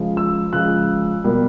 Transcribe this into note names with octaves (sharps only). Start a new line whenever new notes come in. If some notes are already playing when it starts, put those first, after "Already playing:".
Already playing: C#3 F3 G#3
E6
C#3 F3 G#3 F#6
B2 G3 A#3